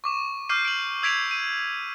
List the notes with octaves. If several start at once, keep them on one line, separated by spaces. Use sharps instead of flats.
C#6 D6 E7
D6 F6 G6 C7 D#7
D7 F#7
E6 G#6 B6 D7 F7 F#7
D#7